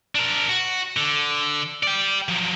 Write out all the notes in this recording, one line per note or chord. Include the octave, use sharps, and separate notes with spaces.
D4 A#4
F#4
D3
D5 G5
F3 F#3